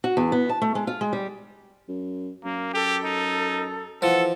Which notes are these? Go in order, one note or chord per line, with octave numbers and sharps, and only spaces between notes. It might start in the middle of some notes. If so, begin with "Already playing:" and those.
F#4
E2
B3
A5
A3
G#3
F4
G#3
G3
F#2
F#2 A#3
G4 A4
D#4
E3 F3 A4 F#5